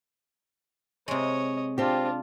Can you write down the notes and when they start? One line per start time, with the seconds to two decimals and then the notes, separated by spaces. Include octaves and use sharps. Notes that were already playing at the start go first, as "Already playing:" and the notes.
1.08 C3 G#3 C#5 D#5
1.78 C4 D4 F4 G4